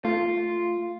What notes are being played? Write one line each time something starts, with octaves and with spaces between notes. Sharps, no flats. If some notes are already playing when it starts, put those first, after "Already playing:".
A3 F4